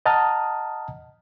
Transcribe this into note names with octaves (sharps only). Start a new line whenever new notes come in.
D#5 F#5 A5 A#5 D#6 F6